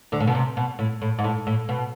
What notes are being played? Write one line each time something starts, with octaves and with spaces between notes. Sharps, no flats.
D2 D3
A2
B2
C3
B2
A2
A2
G#2
A2
A2
B2